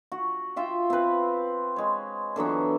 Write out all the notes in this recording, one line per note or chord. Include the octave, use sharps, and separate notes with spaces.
F#4
F4 E5 G5
C4 B4
G#3 C#5
D3 E3 F#3 B3